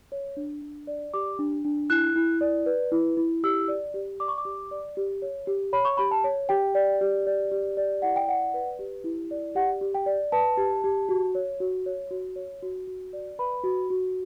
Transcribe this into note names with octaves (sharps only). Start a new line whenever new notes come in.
C#5
D4
D4
D5
G4 D6
D4
D4
E4 F#6
E4
D5
B4
E4
E4
G4 E6
D5
G4
D5 D6
C#6
D6
G4
D5
G4
C#5
G4
C#5 B5
C#6
G4 B5
A5
C#5
G4 G5
D5
G4
D5
G4
D5
E4 F#5
G5
D5 F#5
B4
G4
E4
D5
G4 F#5
G4
G5
D5
B4 A5
G4
G4
F#4
C#5
F#4
C#5
F#4
C#5
F#4
F#4
D5
B4 B5
F#4
F#4